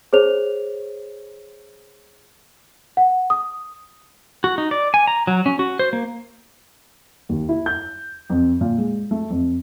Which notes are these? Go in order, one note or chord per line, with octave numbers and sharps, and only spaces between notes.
G#4 C5 C#5 F7
F#5
D#6
F#4
D#4
D5
G#5
A#5
F#3
C#4
F#4
C5
A#3
D#2
E4
G6
F2
A#2
G#3
A3
F2